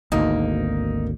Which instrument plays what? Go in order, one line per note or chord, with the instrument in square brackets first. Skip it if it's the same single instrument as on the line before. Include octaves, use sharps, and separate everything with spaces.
[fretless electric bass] G#1 D2 [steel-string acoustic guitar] A#3 [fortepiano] D#4